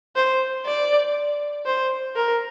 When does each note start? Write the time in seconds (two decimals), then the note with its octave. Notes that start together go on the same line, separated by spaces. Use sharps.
0.16 C5
0.66 D5
1.66 C5
2.16 A#4